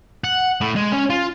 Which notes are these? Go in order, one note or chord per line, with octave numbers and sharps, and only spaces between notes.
F#5
A2
G#3
C#4
F4